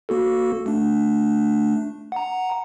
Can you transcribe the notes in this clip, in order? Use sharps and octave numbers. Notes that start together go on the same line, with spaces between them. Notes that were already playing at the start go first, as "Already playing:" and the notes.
A#3 F#4 A4
A3 D4
F#5 A#5